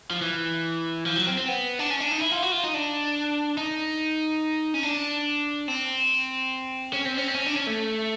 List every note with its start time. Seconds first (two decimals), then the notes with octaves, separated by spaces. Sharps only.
0.10 F3
0.22 E3
1.06 F3
1.16 F#3
1.27 C4
1.38 C4
1.48 B3
1.79 D4
1.90 C#4
2.00 D4
2.11 D#4
2.21 E4
2.32 F4
2.42 F#4
2.52 F4
2.64 D#4
2.74 D4
3.57 D#4
4.74 C#4
4.83 D4
5.68 C4
6.93 C#4
7.05 C4
7.17 C#4
7.28 C4
7.35 C#4
7.46 D4
7.56 C#4
7.67 A3